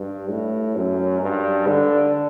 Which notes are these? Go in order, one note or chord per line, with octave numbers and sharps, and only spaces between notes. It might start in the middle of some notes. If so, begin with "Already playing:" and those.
Already playing: G2
A2
F#2
G2
D3